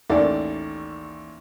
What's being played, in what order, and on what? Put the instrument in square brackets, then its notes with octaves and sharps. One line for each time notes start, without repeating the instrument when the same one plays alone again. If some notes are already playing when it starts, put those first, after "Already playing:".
[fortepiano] A1 D#2 D#3 A4 D5